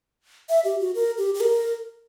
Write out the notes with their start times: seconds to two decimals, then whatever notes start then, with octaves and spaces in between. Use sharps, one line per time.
0.49 E5
0.65 G4
0.80 F#4
0.95 A#4
1.18 G4
1.34 G4
1.40 A#4